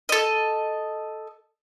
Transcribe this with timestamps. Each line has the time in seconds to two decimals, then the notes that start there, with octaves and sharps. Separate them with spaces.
0.09 A4 D#5